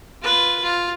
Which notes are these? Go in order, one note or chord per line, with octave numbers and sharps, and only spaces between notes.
F4 B4
F4